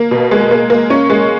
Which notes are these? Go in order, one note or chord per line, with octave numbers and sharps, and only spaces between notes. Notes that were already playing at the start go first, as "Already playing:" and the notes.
Already playing: A#3
B2
G#3
A#3
A#3
C#4
G#3